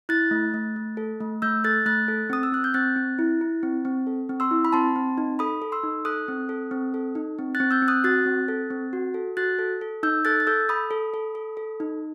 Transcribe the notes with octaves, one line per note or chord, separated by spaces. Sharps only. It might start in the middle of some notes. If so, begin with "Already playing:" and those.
E4 F#6 A6
A3
A3
A3
A4
A3
A3 E6 G6
A4 F#6 A6
A3 F#6 A6
A4
C4 D#6
E6
C4 F#6
G6
C4 F#6 A6
C4
E4
E4
C4
C4
A4
C4
C6 E6
E4
B5
C4 A5 C6
C4
D#4
A4 B5 D#6
A4
C6 E6
D#4
A4 D#6 F#6
C4
A4
C4
A4
D#4
C4
F#6 A6
C4
E6 G6
C4
D#6 F#6
F#4 F#6 A6
C4
A4
C4
F#4
A4
F#4 F#6 A6
A4
A4
D#4 E6 G6
A4 F#6 A6
A6
A4 E6 G6
A4 B5 D#6
A4
A4
A4
A4
D#4